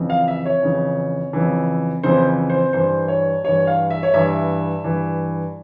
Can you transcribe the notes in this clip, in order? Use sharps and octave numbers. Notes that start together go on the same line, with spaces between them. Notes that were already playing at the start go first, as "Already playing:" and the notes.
Already playing: F2 C#3 E3
F5
E5
C#5
F2 C#3 E3
F2 C#3 E3
F2 C#3 E3 C5
C5
G2 E3 C5
C#5
G2 E3 C#5
F5
E5
C#5
G2 E3 E5
G2 E3